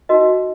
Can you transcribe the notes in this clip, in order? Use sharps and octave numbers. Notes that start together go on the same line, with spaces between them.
D#4 F#4 A#4 D#5